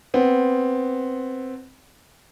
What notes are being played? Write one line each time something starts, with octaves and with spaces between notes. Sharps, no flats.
B3 C4